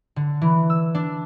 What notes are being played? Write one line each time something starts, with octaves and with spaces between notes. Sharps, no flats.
D3
E3
E6
D4